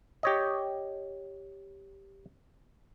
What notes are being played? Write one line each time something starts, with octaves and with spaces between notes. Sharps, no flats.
G4 C#5 D#5